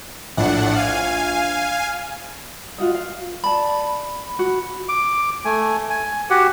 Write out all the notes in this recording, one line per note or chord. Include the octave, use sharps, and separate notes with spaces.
A#1 A2 D4 F#5
F5 G#5
F4 F#4 D#5
F5
D5 A5 B5
F#4
D6
A3 G#5
G#5
F#4 G4 F#5